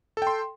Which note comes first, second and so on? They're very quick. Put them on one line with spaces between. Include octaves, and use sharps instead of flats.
A4 G5 C6